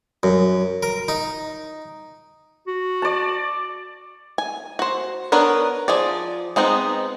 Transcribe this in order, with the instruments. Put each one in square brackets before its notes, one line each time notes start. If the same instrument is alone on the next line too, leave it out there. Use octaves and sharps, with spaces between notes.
[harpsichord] F#2
A#4
D#4
[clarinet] F#4
[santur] D5 A5
[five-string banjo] G#5
F#4 C5
B3 D4 A#4 B4 C#5
F3 G#4 D5
G#3 B3 C4 D#4